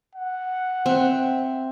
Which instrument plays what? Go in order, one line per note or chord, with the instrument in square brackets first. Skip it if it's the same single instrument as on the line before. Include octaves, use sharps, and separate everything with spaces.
[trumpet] F#5
[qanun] C4 E5